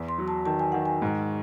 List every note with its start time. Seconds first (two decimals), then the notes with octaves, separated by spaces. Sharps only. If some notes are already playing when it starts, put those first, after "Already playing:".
Already playing: E2
0.09 C6
0.18 F#3
0.28 A5
0.45 D#3 A5
0.59 G#5
0.72 D#3 F#5
0.85 G#5
1.02 G#2